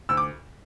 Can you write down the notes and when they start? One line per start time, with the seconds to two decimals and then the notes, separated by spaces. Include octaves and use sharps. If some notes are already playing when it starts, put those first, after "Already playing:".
0.09 D2 E6
0.17 D6